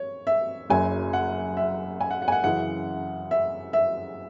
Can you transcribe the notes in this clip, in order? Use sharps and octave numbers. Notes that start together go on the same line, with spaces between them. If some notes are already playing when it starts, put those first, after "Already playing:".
Already playing: C#5
E5
F#1 F#2 F#3 G#5
F#5
E5
G#5
F#5
F#5
G#5
F#5
F#2 C#3 E3 F#5
E5
E5